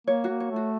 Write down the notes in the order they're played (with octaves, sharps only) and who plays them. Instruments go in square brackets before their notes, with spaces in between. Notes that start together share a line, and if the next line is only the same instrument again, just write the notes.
[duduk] A#3 [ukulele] C#5
[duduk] A#3 [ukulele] F#4
[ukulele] C#5
[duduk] A3
[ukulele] F#4